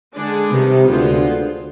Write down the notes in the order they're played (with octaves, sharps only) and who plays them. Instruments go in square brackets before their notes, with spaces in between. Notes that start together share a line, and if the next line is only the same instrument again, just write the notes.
[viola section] D3 G#3 D4 G#4
[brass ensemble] C3 [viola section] D#3 G3 B3
[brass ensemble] D2 D3 [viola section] G#3 B3 F4 C5